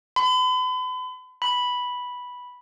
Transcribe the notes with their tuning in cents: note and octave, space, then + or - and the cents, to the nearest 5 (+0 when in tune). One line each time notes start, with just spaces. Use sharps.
B5 +40
B5 -5